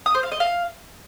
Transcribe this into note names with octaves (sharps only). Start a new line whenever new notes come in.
D#6
C5
F5
D#5
F5